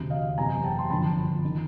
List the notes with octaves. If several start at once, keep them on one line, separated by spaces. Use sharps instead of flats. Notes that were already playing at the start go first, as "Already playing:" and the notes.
Already playing: E1 D2 C3
D#5 F5
F#1 E2 C3 G#5 A#5
G5 A5
C6
G1 F2 D3 A5 B5
D#3